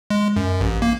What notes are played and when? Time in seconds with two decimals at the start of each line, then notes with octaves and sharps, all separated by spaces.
0.10 G#3
0.36 F#2
0.61 A1
0.82 A#3